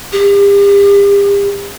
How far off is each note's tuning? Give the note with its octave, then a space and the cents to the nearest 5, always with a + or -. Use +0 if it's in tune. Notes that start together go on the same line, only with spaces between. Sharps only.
G4 +40